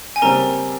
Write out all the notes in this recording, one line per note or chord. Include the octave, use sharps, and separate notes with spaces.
G#5
C#3 G3 C4 A#4 A#5